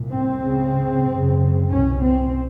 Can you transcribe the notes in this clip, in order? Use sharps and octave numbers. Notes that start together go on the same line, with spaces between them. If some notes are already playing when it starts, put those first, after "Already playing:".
Already playing: C2 A#2
C4
C#2 C#3
F#2 C#3
C2 B2 C#4
C4